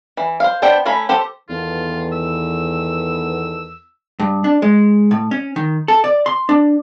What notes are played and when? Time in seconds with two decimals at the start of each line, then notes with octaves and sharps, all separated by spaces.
0.17 E3
0.40 C5 F5
0.62 B3 D4 C5 D5 G5
0.86 A3 C#4 A#5 B5
1.09 G4 A4 C5
1.49 E2 D#3 B3 F4 A4
2.12 E6
4.20 G2
4.44 D4
4.62 G#3
5.11 A2
5.31 C#4
5.56 D#3
5.88 A4
6.04 D5
6.26 C6
6.49 D4